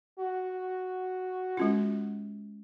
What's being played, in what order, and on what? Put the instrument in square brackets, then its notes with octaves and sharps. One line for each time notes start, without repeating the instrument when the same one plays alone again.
[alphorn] F#4
[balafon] G#3 C#4 F4